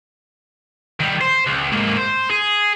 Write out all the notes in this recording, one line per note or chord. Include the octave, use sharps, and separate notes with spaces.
D#3 G3
C5
C#2
G#2 A#3
C5
G#4